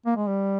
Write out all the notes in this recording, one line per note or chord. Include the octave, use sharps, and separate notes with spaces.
A#3
G#3
G3